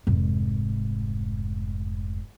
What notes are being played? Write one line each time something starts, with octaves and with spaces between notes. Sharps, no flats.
F1 G#2